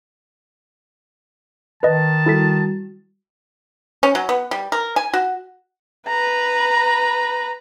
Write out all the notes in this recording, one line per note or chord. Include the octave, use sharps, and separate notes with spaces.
D#3 B4 D#5 A5
G3 E4 F#4 A4 B6
C#4
F#3
B3
G3
A#4
G#5
F#4
B4 A#5